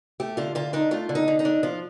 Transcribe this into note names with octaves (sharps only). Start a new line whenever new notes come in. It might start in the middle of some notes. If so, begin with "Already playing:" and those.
A3 G4
D3 F4
D3 F4
D4 D#4
A3 F4
D3
D#4
D3
D#4
D4
F3 F4